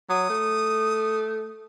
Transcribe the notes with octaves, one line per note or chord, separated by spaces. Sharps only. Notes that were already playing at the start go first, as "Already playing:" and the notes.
F#3 D#6
A3